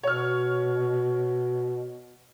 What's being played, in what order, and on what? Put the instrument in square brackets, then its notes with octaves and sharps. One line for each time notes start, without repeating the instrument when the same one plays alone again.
[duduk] B2 [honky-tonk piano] C#5 F6